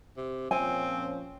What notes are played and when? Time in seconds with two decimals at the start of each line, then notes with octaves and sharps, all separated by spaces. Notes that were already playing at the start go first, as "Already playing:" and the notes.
0.17 C3
0.51 A#2 F3 C4 C#4 G#5